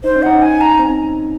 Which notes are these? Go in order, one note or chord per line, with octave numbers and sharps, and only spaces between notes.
D#4 C5
C#4
D#4 F#5
G#5
A#5
C4